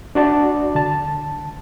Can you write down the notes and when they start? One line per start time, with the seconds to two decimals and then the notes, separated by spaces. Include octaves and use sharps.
0.15 D4 F#4 D5 A5
0.75 D3 A5